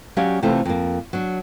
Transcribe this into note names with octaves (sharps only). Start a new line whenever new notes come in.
F#3 C#4 G4 D5 F5 G#5
C3 E3 A3 C4 F4 A4
F2 A#3
F#3 D4